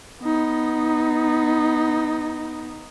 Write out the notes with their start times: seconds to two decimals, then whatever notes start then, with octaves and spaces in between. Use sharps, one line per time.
0.22 B3 D#4